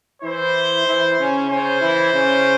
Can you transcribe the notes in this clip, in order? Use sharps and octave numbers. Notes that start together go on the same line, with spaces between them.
E3 E4 C5
E3 E4
C#3 C#4
C#3 C#4 C5
E3 E4
C#3 C#4